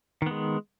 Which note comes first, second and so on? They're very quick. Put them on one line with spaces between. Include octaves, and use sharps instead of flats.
D#3 B3 G#3